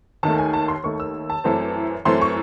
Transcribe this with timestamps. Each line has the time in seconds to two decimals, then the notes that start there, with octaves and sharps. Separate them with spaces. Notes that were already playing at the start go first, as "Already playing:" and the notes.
0.23 D#2 D#3 A3 A5
0.38 G#5
0.54 A5
0.68 C6
0.84 D#2 D#3 A3 C#6
1.00 E6
1.30 A5
1.44 F#2 E3 A3 C4
2.05 F#2 E3 A3 C4 C6
2.21 C#6